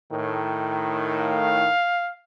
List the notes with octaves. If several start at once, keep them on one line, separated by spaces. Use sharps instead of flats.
A2 D#3
F5